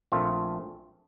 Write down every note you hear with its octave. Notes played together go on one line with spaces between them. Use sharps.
A#1 A#2 A3 C4 F4